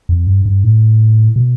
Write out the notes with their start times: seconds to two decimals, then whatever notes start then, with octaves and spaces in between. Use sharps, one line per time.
0.09 F2
0.27 G2
0.46 G2
0.64 A2
1.36 B2